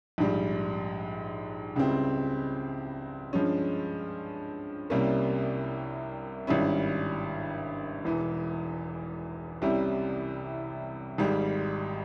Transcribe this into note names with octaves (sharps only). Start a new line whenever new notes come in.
A#1 G#2 G3
C#2 C#3 G3 C4 E4
G2 F3 G#3 C#4
C2 C3 G3 A#3 C#4
G#1 G2 G3 C#4 E4
E1 E2 E3
C2 C3 G3 C#4 E4
G#1 G#2 G3